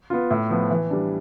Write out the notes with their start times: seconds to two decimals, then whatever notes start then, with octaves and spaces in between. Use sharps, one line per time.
0.10 B3 F4
0.31 A2
0.50 F3 B3
0.70 E3
0.90 G3 D4